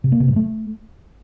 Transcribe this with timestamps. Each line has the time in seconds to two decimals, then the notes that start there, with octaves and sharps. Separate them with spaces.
0.04 C3
0.12 A#3
0.20 C3
0.28 G2
0.36 A3